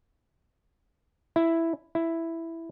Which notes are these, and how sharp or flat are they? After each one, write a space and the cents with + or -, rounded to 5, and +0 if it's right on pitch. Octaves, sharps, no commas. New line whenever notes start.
E4 +0
E4 +0